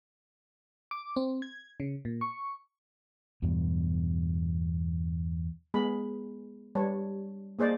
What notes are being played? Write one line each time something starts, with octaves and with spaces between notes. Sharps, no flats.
D6
C4
G#6
C#3
A#2
C#6
E2 G2 B2
G#3 B3 G#4 B5
G3 C#5 A5
A#3 G#4 C5 D5 D#5